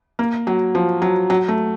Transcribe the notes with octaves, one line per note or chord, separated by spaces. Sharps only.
A#3
F#3
F3
F#3
F#3
A3